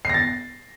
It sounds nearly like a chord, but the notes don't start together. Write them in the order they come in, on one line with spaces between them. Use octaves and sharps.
C7 A#6 A6